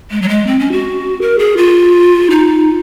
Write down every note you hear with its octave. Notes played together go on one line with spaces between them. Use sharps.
G#3
F#3
G#3
C4
C#4
F#4
A#4
G#4
F4
D#4